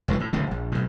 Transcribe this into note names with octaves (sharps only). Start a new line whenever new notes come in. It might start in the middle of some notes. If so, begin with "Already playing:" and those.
F1 C#2 D3 E3
A2
D1 D2 A2 C#3
A#1
B1 A2